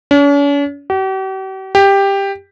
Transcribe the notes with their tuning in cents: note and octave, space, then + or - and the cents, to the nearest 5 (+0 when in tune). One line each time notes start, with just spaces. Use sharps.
C#4 +45
G4 -45
G4 +10